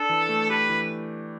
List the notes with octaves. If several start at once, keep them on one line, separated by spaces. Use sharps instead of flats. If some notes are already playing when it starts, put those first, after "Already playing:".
Already playing: D4 A4
E3
A3
G4 B4
E3